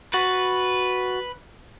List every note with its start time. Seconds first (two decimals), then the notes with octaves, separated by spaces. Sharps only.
0.14 F#4 B4 A6